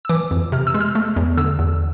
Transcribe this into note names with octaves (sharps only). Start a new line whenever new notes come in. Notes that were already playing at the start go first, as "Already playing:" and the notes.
E6
E3 D6
F2
C3 F6
E6
G#3
F6
A3
E2
D3 E6
E2